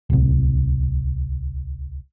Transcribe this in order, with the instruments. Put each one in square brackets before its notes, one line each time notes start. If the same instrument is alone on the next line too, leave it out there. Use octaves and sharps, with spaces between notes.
[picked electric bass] D1 C2